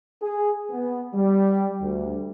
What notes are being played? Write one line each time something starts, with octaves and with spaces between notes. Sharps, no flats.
G#4
B3
G3
D2